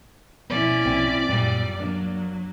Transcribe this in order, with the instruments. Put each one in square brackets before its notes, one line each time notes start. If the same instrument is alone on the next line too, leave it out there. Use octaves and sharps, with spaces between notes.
[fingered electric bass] B2 F3 B3 [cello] C#4 E4 [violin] D5
[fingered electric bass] B1 C3 F3 [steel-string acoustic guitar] C4
[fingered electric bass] F#2 [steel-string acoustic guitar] A#2 [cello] G3
[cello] F#3 [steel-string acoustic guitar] A#3 D4